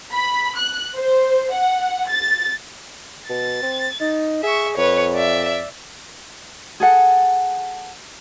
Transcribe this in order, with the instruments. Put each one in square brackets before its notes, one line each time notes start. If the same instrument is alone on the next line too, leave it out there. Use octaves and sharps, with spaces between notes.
[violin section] B5
F#6
C5
F#5
A6
[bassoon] B2 [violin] A6
[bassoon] C4
D#4
[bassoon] G#4 [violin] E5 C#6
[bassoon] F2 [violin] B4 C#5
[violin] D5 E5
[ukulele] G#4 A4 F#5